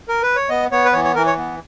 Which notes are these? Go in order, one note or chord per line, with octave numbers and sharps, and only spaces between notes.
A#4
B4
C#5
B3 D#5
B3 C#5
B4
E3 C#5
C#5
E3 A#4
C#5
B3